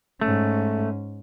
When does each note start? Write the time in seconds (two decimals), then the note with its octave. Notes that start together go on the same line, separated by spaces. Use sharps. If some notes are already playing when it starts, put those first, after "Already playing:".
0.21 G#2 A3 C#4